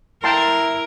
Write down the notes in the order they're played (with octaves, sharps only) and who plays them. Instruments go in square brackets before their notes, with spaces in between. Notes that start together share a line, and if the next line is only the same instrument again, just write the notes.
[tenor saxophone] E4 [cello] A#4 [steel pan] G5 A5 C6